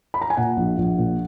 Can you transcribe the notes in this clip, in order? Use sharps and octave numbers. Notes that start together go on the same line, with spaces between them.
B5
A#5
G#5
A#2 F#5
A#1
A#1
A#2